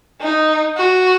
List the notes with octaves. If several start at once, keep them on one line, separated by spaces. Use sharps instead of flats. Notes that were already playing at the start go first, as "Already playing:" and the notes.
D#4
F#4